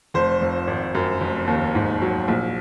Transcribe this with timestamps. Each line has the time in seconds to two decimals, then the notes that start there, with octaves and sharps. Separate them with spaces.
0.14 F1 C5
0.42 F2
0.67 G#1
0.95 F#2
1.21 F1
1.47 D#2
1.75 G#2
2.02 F#3
2.28 A#1